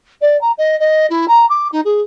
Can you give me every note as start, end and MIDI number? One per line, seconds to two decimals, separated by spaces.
0.21 0.39 74
0.41 0.51 82
0.58 0.78 75
0.79 1.06 75
1.10 1.25 64
1.28 1.46 82
1.49 1.68 86
1.72 1.80 63
1.84 2.01 68